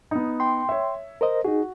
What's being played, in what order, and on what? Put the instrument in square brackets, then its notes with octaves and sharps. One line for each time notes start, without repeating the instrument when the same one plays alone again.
[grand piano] B3 D#4
[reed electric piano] G5 C6
[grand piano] C#5 E5
[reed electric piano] A#4 C5 D#5
[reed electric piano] D#4 G#4 [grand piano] F#4